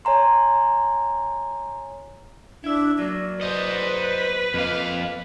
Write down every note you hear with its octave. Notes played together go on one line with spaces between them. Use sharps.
C#5 G#5 A#5 C6
D4 E4 E5
F#3 A#3 D5
B4 C5 D#5
F2 A#3 D#5 F5